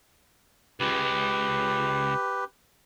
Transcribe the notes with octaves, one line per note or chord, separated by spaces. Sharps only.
C#2 G#3 G4 B4